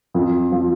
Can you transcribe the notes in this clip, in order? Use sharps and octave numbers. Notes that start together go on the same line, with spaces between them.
F2
F3